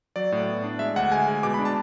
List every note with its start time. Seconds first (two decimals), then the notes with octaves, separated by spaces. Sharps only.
0.16 F#3 D5
0.32 A2
0.48 B3
0.63 D4
0.79 G#3 E5
0.96 D2 F#5
1.11 G#3 G#5
1.28 G#3
1.43 B2 D6
1.54 D4 B5
1.65 A5